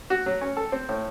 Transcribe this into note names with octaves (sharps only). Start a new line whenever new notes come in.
F#4
F#3
C#4
A4
C4
A2